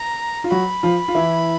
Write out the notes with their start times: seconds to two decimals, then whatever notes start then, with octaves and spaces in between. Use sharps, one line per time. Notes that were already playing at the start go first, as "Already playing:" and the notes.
Already playing: A#5
0.44 F4
0.51 F#3 F#4 B5
0.83 F3 F4
1.08 F4
1.15 E3 E4